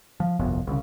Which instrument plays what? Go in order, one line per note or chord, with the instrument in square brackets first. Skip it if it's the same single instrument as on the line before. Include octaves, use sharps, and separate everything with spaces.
[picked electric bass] F3
G1 C2 F2 B2
C2 C#3